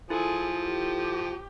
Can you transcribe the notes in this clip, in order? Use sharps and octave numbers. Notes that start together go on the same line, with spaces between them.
F3 E4 G#4 A4
G4